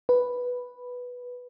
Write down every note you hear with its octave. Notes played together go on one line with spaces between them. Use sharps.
B4